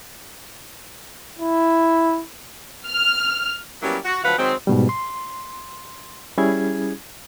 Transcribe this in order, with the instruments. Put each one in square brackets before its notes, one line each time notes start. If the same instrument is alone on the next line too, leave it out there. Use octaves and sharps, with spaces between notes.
[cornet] E4
[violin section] F6
[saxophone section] F#3 G3 A#3 B3 C#4 E4
F#4
D2 F3 F#3 B4 F5 F#5
D#3 F#3 G#3 C4
[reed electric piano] G#2 B2 G3
C6
G3 C#4 E4 G#4 G#6